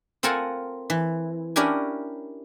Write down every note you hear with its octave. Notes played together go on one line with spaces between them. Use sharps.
C4 F4 A4 A#4 F#5 G#5
E3
C#4 D4 E4 G4 A#4 G#5